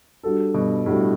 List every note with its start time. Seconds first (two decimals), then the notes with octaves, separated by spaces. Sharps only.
0.23 G3 D4 F#4 A4
0.54 G2 B2
0.85 A2 G3 D4 F#4 A4